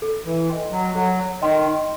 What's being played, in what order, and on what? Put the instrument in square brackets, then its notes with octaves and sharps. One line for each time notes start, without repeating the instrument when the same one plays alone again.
[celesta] A4
[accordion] E3
[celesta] D#5 G5 C6
[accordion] F#3
[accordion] F#3 [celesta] A4
[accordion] D#3 [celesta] D#5 G5 C6